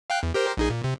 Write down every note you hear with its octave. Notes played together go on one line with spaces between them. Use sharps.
F5 G5 F#6
E2
G4 A#4 C5
A#1 D#4 G#4
A#2
C3